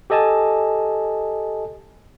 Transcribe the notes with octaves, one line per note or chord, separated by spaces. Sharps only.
G4 A4 D#5 G#5 A5